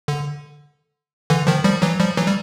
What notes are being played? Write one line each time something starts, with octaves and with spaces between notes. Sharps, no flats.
D3
D3 E3
D#3 F3
F3 G3
E3 F#3
F3 G3
E3 F#3
G3